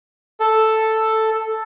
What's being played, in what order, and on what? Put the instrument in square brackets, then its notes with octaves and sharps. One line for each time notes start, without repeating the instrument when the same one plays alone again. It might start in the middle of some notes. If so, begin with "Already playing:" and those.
[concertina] A4